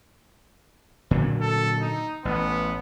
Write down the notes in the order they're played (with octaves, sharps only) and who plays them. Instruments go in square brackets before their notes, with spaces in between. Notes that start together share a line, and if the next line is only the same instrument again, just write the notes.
[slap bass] A#2 D3 F#3
[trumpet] A4
D#4
[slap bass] A1 [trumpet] B3